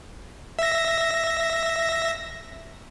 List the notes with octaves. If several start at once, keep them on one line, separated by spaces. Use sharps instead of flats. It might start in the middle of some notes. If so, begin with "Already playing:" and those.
E5 A#6